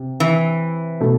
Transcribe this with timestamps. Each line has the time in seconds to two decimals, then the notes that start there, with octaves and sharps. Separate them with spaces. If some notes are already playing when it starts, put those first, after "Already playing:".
Already playing: C3
0.20 E3
1.01 B2 A3